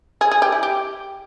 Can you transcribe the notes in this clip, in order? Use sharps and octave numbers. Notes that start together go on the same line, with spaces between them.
G#4
G#4
G4
E4
G4